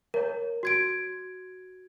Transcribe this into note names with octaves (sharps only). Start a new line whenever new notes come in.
A#4 C#5
F#4 G#6 D7